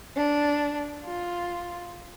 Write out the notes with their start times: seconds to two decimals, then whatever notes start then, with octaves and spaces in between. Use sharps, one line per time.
0.17 D4
1.05 F4